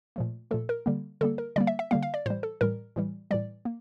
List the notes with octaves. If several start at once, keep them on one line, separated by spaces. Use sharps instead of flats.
A#2 F3 A3
A#2 F3 A3 A4
A#4
D3 G3 A#3
D3 G3 A#3 A4
A#4
D3 G3 A#3 D5
E5
E5
D3 G3 A#3 F5
F5
D5
A2 E3 G3 C5
A4
A2 E3 G3 A#4
A2 E3 G3
A2 E3 G3 D5
A#3